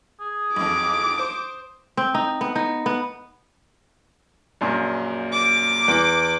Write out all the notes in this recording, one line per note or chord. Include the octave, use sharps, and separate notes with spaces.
G#4
B1 F2 D6
C5 D#6
C4
D#4
B3
D#4
B3
A#1 F#2 A#2
D6
E2